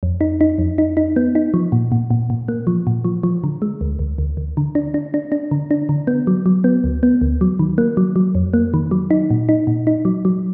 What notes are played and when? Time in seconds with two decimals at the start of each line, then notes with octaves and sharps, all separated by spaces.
0.03 F2
0.21 D#4
0.41 D#4
0.58 F2
0.78 D#4
0.97 D#4
1.16 B3
1.35 D#4
1.54 F3
1.72 A#2
1.92 A#2
2.10 A#2
2.30 A#2
2.48 A#3
2.67 F3
2.87 A#2
3.04 F3
3.23 F3
3.44 D3
3.62 G#3
3.81 D2
3.99 D2
4.18 D2
4.37 D2
4.57 D3
4.75 D4
4.94 D4
5.14 D4
5.32 D4
5.51 D3
5.71 D4
5.89 D3
6.07 B3
6.27 F#3
6.46 F#3
6.64 B3
6.84 D2
7.03 B3
7.21 D2
7.41 F#3
7.59 D#3
7.78 A#3
7.97 F#3
8.16 F#3
8.35 F2
8.54 A#3
8.74 D#3
8.91 F#3
9.11 D#4
9.30 A#2
9.49 D#4
9.67 A#2
9.87 D#4
10.05 F#3
10.25 F#3